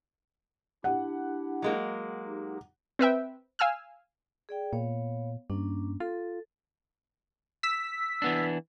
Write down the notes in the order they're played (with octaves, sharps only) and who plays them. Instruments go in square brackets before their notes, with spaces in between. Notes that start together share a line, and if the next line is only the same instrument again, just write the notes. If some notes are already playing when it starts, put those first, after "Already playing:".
[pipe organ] D4 E4 G4 [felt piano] F#5
[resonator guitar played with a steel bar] F#3 G#3 A#3
[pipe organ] D#4 G4
[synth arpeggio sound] C4 B4 E5 G5
F5 G#5 E6 F6
[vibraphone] G#4 D5 G5
[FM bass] A#2 [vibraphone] B3 C#5 F5
[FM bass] G2 [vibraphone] A#3 C#4 D4
[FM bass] F4 [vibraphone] A4
[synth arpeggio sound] E6 B6
[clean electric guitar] E3 B3 D4